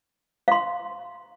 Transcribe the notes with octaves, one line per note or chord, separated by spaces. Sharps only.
F5 C6